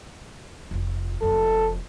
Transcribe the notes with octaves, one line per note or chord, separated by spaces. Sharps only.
F1 F4
F1 C4 A4